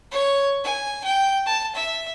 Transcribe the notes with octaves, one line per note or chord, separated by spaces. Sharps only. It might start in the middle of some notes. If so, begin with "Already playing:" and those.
C#5
G#5
G5
A5
E5